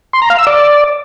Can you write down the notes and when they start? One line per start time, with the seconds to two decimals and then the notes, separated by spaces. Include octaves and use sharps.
0.13 C6
0.22 A#5
0.30 F5
0.38 E6
0.47 D5